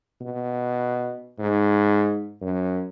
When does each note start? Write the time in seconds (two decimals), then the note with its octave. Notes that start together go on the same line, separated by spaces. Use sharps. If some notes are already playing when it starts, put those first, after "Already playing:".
0.21 B2
1.39 G#2
2.42 F#2